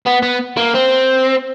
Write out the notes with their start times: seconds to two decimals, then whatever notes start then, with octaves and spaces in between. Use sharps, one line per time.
0.07 B3
0.23 B3
0.57 A#3
0.74 C4